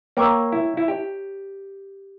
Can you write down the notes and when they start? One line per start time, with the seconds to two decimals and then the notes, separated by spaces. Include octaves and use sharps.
0.17 A#3 C#5 G5 A#5 C#6 E6
0.52 E4
0.77 E4
0.88 G4